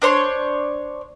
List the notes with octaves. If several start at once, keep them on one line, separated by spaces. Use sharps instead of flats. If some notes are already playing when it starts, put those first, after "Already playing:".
D4 C5 C#5 C6